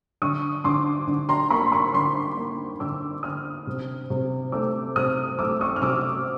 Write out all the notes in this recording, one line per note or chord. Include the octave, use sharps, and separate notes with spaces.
D3 C#6 D#6
D3 C6 D6
D3
A#5 C6
A#3 B5 C#6
C6
B5 C#6
D3 C6 D6
A#3
D3 D6 E6
D3 D#6 F6
C3
C3
A3 D6 E6
C3 D#6 F6
A3 D6 E6
C#6 D#6
F6
C3 D6 E6